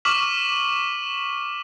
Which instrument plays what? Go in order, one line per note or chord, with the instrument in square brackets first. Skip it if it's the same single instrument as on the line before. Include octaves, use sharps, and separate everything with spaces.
[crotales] C#6 D6 F6 B6 E7 F#7